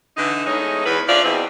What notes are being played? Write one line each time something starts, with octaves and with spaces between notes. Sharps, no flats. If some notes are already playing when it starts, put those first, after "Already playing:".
D3 E3 D#4
E2 G#3 A3 C#4 D#4
E2 B4
F3 C#4 D4 E4 F4 D5
E2 B2 C4